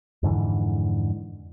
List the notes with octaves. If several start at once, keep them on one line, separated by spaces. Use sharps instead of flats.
F2 G#2 D3 E3